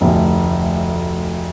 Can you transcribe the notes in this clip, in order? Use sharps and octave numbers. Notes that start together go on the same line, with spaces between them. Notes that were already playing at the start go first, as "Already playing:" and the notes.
F1 D2